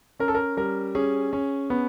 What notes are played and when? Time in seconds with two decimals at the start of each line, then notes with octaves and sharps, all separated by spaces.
0.20 C#4 A#4
0.28 A4
0.35 A#4
0.57 G3 A#4
0.95 C#4 G#4
1.33 C#4
1.70 B3